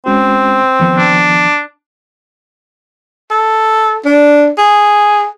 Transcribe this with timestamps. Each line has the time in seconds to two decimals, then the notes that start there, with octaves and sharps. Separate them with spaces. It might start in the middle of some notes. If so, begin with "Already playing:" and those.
0.06 G#3 C4 C#4 F#4
0.80 D#3 F3 B3
0.97 D4
3.31 A4
4.05 D4
4.58 G#4